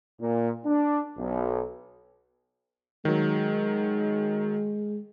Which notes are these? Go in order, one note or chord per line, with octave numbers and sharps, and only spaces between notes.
A#2
D4
B1
D#3 F#3 G#3